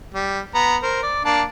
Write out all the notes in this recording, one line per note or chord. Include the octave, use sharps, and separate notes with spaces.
G3
B3 A#5
A#4 C5
D5
A#3 D4 A5